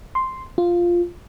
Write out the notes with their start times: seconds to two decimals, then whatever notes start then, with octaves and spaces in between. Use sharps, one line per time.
0.15 C6
0.58 F4